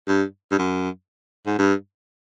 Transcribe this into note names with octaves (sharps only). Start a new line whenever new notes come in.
G2
G2
F#2
G#2
G2